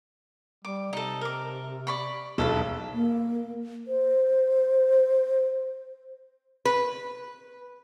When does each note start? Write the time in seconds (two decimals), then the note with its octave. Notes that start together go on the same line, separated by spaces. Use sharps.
0.65 G3 D6
0.93 C3 D#4 A4
1.21 A#4 D6
1.87 D5 B5 C#6
2.38 E1 B1 A4 B4 E5
2.94 A#3
3.87 C5
6.65 B4